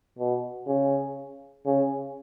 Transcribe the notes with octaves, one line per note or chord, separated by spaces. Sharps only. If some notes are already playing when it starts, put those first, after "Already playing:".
B2
C#3
C#3